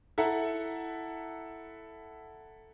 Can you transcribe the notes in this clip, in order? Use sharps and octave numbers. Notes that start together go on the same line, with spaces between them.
E4 A4 E5 F#5 A#5